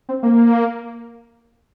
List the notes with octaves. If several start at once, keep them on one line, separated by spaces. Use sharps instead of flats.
C4
A#3